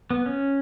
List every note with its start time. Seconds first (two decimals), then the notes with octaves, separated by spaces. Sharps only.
0.10 B3
0.26 C#4